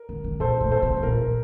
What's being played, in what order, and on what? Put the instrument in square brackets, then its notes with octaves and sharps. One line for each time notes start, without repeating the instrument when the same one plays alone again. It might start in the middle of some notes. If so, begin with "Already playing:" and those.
Already playing: [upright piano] A#4
[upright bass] D3
D3
[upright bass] A#2 [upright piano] A4 C5
[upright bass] A2
[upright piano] A4 C5
[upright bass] C3
C3
[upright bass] A#2 [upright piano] A#4